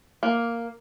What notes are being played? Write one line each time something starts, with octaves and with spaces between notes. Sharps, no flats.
A#3